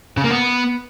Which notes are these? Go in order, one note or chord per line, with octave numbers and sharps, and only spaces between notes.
C#3
A#3
B3